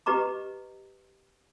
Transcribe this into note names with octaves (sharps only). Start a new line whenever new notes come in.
G4 B4 D#5 A#5 D6